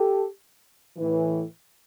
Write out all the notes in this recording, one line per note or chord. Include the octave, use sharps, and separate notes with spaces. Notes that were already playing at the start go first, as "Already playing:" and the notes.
Already playing: G4 A4
A2 E3